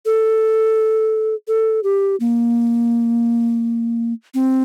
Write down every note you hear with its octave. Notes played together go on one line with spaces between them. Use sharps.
A4
A4
G4
A#3
C4